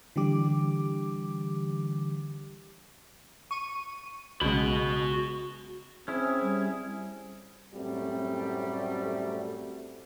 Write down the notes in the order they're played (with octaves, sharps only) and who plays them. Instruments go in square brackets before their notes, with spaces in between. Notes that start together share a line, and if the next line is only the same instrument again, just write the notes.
[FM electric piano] D3 E3 G3 G4 D6
[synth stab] C#6 D#7
[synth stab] B1 C#3 G#3 [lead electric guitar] F#4 B5
[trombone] C4 [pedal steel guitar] C#4 E4 [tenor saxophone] G#4
[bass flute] G3
[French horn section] F#2 A2 G3 A3 C4 F#4